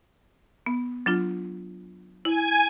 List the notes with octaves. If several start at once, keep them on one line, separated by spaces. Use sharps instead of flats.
B3
F#3 D4 F4
E4 G#5